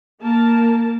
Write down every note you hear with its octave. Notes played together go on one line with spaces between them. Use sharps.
A#3 A#4 A5